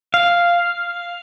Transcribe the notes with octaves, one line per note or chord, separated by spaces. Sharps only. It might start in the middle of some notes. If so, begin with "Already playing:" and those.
F5